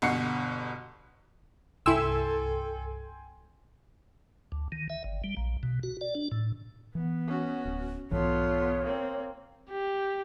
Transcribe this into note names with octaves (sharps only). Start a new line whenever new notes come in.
G1 B2 F#4 C7 C#7
C2 G2 E4 A4 G5 G#5 C6 E6
D2
D#3
E5
G1
G3
A#1
B2
F#4
D5
D4
A2
E3 B3
C#4 F#4
D1
B1 G#2 E3 B3 F4 A4 C#5 C6
A#3 C4
G4